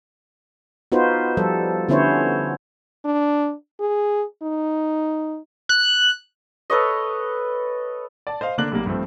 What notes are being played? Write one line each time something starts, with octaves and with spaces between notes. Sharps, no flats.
B3 D#4 F4 F#4 B4 C5
F3 G3 A4
D3 B3 C#4 E4 C5 C#5
D4
G#4
D#4
F#6
A4 B4 C#5 D#5
D5 A5
C5 D#5 F5
D3 A#3 D4 F#6 F#7
B1 G3 A#3
G2 F3 A3 C4